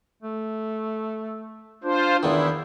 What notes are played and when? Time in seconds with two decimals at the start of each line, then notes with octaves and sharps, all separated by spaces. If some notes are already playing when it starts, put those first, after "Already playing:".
0.22 A3
1.84 D4 F4 C5
2.23 E2 D#3 E4